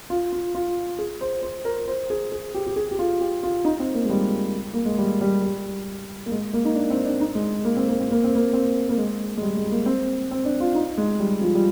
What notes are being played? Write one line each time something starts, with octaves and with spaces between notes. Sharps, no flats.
F4
F4
F4
G#4
C5
C5
A#4
C5
G#4
G#4
G4
G4
G#4
G4
F4
G4
F4
D#4
C4
A#3
G#3
G3
A#3
G#3
G3
G3
G3
A#3
G#3
A#3
D#4
D4
C4
D4
D#4
G#3
A#3
C4
A#3
C4
A#3
C4
A#3
C4
A#3
G#3
G#3
G3
G#3
A#3
C4
C4
D4
F4
D#4
G#3
G3
F3
G3